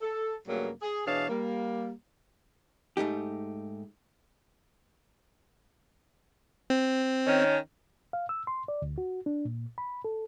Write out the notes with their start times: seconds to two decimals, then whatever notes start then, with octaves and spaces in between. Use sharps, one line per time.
0.01 A4
0.47 G2 C#3 F#3 G3 A3 A#3
0.82 G#4
1.06 B2 E3 D4 G#4 C#5 F5
1.29 G3 A#3
2.97 G#2 A3 D#4 G4
6.70 C4
7.26 D#3 C#4
8.13 F5
8.29 E6
8.47 C6
8.68 D5
8.82 D2
8.98 F#4
9.26 D4
9.45 A#2
9.78 B5
10.05 A4